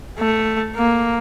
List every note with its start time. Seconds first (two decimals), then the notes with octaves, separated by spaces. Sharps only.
0.18 A3
0.76 A#3